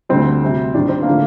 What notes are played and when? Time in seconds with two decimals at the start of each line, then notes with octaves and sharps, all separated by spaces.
0.09 D2 D3 G3 C4
0.42 D2 C3 G3
0.74 G2 D#3 G3 D4
0.89 C4
1.02 A#3 D4
1.08 D3 F3 A3